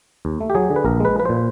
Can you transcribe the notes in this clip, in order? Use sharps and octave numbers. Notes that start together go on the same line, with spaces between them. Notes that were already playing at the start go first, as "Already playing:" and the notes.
D#2
A3
G4
F#3 G#4
D3
B4
A#1 A#4
G#3 B4
F3 B4
A#2 C5